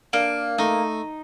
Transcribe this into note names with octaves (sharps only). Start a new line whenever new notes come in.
A#3 D4
A3 D#4